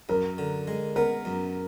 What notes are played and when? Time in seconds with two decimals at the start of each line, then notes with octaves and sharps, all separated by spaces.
0.09 F#2 A#4
0.38 D3
0.67 G#3
0.96 B3 A#4
1.25 F#2